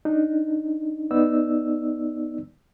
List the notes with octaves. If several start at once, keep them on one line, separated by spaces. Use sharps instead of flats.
D4 D#4
B3 D#4 D5 E6